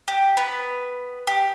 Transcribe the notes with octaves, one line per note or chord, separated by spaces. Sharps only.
G4
B3 B4
G4